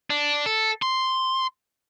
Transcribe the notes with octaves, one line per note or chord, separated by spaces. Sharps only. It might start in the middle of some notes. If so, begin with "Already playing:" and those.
D4
A4
C6